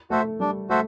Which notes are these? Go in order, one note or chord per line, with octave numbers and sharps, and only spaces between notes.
A3 F#4 A4 C5 E5
G3 D4
A3 F#4 A4 C5 E5